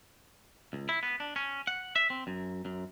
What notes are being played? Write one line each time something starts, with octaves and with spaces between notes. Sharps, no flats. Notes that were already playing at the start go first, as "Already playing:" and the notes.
C#2
E4
B3
D4
C#4
F#5
E5
C4
F#2
F#2